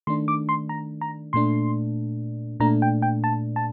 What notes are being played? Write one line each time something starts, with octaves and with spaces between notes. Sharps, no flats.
D#3 A3 D4 C6
D6
C6
A#5
A#5
A#2 A3 D4 C6
A#2 A3 D4 A#5
G5
G5
A5
A5